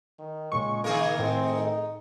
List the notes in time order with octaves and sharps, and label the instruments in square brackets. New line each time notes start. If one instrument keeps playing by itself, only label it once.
[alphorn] D#3
[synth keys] A#2 C#3 C#6 [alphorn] G#3
[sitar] D#3 G#4 A#4 [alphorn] A#3
[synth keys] A2 [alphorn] C4
[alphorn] D#4